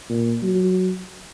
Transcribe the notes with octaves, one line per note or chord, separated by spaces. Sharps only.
A#2
F#3